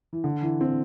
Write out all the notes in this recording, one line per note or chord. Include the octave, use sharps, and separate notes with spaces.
E3
D3
E3
C4